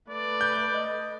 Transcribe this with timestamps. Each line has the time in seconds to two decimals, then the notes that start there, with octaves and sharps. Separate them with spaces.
0.10 A3 B4 D5
0.41 G6
0.73 D#5